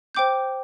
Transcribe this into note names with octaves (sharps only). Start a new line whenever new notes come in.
C5 G5 D6 G6